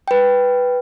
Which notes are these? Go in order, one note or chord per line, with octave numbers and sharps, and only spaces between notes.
B4 G5